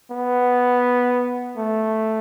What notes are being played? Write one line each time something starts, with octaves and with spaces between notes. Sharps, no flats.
B3
A3